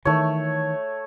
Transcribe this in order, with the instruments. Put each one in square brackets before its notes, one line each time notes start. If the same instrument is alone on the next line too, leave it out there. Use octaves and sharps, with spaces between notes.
[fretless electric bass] D#3 E3 [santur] A3 C#5